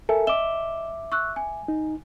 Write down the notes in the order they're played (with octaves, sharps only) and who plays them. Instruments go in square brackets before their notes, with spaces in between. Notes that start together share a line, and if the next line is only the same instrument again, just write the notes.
[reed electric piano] A4 A#4 E5 [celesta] G#5
[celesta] D#5 E7 G7 [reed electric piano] E5 D6
[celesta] C#6 E6 F#6
G#5
[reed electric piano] D#4